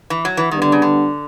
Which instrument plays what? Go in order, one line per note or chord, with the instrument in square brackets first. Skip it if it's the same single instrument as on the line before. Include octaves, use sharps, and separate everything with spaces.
[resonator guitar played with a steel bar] E3
F#3
E3
[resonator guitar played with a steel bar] D#3 [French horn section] G3 B3 D4
[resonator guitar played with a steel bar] D3
C#3
D3